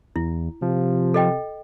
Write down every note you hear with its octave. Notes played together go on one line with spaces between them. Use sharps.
E2 E4
C3 F3
A4 D#5 G5